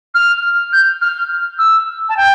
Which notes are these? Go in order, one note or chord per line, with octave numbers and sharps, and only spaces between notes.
F6
G6
F6
E6
A5
G5